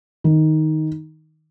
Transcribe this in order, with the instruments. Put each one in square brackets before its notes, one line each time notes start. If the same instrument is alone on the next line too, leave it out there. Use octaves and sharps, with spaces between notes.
[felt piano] D#3